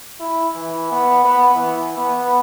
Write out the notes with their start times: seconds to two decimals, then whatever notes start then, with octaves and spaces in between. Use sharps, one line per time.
0.20 E4
0.55 E3
0.92 B3
1.25 B3
1.55 E3
1.97 B3